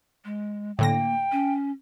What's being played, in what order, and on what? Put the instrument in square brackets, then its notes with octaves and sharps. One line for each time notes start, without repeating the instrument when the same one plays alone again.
[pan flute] G#3
[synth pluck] A2 D3 A#6 [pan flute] A#3 [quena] G5
[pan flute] C#4